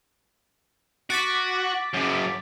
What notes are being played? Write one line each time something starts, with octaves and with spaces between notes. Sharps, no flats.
F#4 D6 A6 B6
F#2 C#3